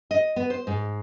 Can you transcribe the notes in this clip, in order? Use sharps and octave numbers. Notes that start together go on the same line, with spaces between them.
D#5
B3
C5
G#2